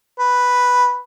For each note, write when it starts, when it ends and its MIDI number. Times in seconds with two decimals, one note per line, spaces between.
0.19 0.99 71